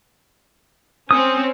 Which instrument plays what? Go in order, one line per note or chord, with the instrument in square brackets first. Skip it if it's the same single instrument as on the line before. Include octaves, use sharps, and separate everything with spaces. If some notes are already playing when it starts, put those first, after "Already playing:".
[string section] C4 C#4 [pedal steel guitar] D#6